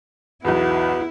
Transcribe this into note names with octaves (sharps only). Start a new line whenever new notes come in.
B1 E2 B3 E4 F#4